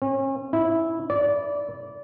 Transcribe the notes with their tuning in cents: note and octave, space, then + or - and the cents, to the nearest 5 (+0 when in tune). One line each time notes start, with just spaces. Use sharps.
C#4 -35
E4 -10
D5 -20